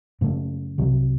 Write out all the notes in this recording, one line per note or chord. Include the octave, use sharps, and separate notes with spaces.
F#2 C#3 A3
C2 C3 F#3